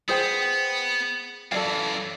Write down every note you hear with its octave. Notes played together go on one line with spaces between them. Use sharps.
B3 G#4 C5 G5
F#2 E3 A4 D5 F5